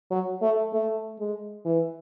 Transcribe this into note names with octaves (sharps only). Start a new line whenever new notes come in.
F#3
A3
A3
G#3
E3